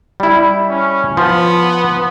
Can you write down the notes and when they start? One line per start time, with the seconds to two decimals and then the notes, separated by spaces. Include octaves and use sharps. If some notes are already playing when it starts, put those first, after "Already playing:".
0.20 G3 E4
0.69 C#4
1.17 F3 B3